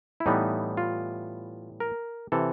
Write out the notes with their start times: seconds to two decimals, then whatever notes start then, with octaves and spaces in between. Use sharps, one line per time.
0.20 E4
0.26 A2 E3 G3 B3 D#4
0.77 F4
1.80 A#4
2.32 C3 E3 A4